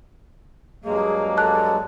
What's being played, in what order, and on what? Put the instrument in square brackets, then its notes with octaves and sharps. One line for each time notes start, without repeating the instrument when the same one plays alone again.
[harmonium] G2 F#3 G#3 [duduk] A#3 [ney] G#4
[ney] A4 [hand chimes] A5 F#6